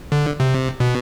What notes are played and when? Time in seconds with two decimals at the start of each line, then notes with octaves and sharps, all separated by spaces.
0.12 D3
0.40 C3
0.80 B2